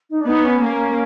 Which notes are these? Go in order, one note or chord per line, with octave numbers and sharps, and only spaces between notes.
D#4
D4
B3 D#4
C#4
A#3